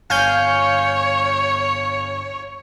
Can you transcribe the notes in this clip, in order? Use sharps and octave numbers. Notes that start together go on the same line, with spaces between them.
G1 C#5 F5 G#5 G6